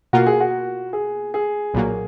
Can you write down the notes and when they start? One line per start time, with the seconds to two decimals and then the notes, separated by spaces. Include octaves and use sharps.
0.13 B2 A#3 F4 F#4 A#4
0.27 G#4
0.40 F#4
0.93 G#4
1.34 G#4
1.74 B1 A#2 F#3 A#3